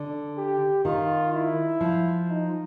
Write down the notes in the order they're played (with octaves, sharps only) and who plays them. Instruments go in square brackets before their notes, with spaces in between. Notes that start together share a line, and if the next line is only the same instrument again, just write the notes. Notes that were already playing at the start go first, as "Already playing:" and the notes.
Already playing: [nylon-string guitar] D3
[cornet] G4
[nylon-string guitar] D#3 [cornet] F4
[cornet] E4
[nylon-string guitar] F3
[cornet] D#4